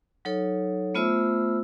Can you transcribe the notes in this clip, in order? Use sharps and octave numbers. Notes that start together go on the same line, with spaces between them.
F#3 D#4 A4 C#5
A3 B3 F4 C5 E5 E6